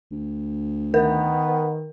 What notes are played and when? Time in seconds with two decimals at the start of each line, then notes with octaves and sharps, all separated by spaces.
0.11 D2
0.94 D#3 B3 A#4